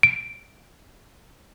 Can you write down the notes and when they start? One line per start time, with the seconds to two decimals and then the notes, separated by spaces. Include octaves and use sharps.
0.03 D7